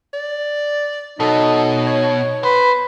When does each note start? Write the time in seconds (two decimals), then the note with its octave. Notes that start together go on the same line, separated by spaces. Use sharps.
0.13 D5
1.20 B2 F#3 D#4 A4
1.87 C#5
2.44 B4 C5